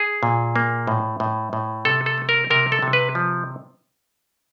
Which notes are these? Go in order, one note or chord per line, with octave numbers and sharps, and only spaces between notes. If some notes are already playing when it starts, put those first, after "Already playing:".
Already playing: G#4
A#2
A#3
A2
A2
A2
C3 A4
A4
A3
A#4
C3 A#4
A4
C3
B4
F3